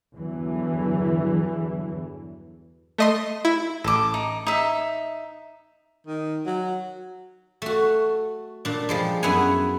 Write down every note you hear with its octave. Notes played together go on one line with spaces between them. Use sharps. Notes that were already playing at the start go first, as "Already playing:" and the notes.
E2 G2 D3 E3 F#3
A3 D#5 C6
E4
A1 A4 D6
D#4
D#4 E5
D#3
F#3
A3 F#4
A#2 D4
F3 G3 G#3
F#2 B3 E4 F#5 G#5